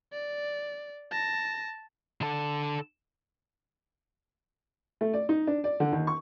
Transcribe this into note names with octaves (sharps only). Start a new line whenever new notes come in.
D5
A5 A#6
D3 A4
A3
D5
D#4
D4
D5
D3
D#2
C#6